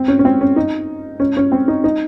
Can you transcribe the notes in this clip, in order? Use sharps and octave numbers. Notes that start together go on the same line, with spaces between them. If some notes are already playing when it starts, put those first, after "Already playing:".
Already playing: C4
C#4
C#4
C4
C#4
D#4
C#4
C#4
C4
D#4
D#4